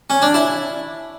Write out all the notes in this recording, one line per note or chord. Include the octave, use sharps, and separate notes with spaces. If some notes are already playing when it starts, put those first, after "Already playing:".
C#4
D4
E4